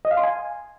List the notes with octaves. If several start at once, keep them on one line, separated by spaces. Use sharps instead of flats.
D#5
F5
C6
G#5